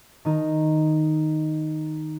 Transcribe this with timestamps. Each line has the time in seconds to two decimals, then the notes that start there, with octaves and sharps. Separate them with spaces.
0.25 D#3 D#4